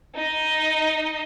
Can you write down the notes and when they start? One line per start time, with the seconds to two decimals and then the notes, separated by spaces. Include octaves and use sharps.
0.15 D#4 D#5